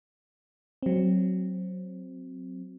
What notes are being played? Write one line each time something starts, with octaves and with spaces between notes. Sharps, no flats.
F#3 C4